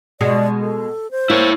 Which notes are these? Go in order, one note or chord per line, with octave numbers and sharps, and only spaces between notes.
B2 G#3 F#4 D5
A4
C5
A#3 E4 C#5